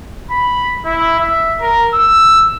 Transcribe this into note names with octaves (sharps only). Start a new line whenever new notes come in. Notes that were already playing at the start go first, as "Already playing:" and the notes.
B5
E4
E5
A#4
E6